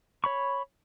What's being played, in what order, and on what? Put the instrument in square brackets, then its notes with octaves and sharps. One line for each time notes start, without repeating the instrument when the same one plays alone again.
[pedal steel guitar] C#5 B5 C#6